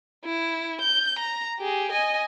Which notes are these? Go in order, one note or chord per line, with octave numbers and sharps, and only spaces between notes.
E4
G6
A#5
G4 G#4
D#5 G#5